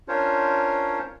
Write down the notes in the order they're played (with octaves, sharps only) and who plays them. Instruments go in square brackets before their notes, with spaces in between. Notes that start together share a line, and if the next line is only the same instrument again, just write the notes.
[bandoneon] C#4 D4 F4 A#4 C5 C#5